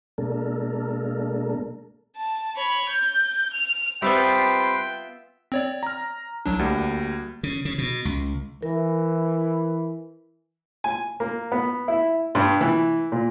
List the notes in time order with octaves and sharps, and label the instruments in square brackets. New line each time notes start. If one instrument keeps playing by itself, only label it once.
[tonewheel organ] B2 G#3 A#3 D4 A4 A#4
[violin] A5
C#5 B5
G6
F6
[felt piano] G3 C4 [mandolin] B3 F4 E5 [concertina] B4 C6 [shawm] G5
[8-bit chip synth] C4 C#5 D5
[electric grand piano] A#5 F6
[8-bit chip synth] C2 F#3 D4
[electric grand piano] D2 G3 A#3
[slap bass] C#3
C#3
B2
C#2
[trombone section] E3 [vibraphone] A#4
[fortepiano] G#5
A#3
B3
E4
G2
E3
A#2